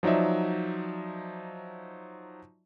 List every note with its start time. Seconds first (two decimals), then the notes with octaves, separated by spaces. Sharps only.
0.03 F3 F#3 D#4 D5 E5